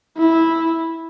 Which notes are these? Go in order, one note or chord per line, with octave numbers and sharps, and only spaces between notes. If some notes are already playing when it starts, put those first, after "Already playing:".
E4